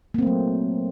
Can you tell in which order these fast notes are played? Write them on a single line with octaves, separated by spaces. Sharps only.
A#3 C4 A3 F#3